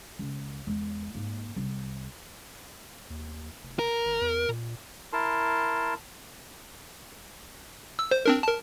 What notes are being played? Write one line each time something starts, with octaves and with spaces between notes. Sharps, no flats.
C#2
E2 G#3
G#2 A#3
C2
D#2
F1
A#4
G#1
E2
A#2
E4 A#4 A5 C6
E6
C5
C4 D4 A#4
A#4 A5